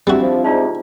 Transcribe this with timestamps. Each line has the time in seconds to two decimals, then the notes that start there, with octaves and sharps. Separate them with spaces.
0.07 G3 C4 D4 E4 F#4
0.21 F3
0.44 G#2 C3 D#4 F4 D5